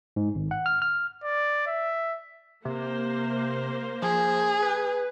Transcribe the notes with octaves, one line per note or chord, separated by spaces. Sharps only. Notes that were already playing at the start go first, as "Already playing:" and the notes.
G#2
G#1
F#5
F6
F6
D5
E5
C3 A#3 C5
F3 G#4
B4